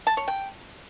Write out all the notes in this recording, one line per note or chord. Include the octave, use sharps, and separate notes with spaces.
A5
C#5
G5